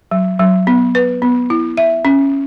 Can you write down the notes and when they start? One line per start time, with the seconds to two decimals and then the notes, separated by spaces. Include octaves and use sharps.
0.11 F#3
0.39 F#3
0.67 B3
0.95 B4
1.22 B3
1.50 E4
1.77 E5
2.05 C#4